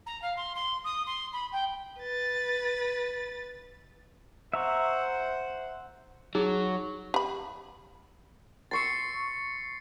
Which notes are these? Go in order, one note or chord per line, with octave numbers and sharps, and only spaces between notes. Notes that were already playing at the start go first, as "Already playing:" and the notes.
A#5
F5
C6
C6
D#6
C6
B5
G5
B4 A6
C5 E5 F#5 A#5 C#6
F#3 D#4 G#4
G4 B5
C6 C#6 E6 A6 C7 C#7